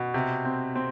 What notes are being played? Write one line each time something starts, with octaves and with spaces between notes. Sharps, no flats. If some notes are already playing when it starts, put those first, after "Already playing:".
Already playing: B2
C3
C4
C4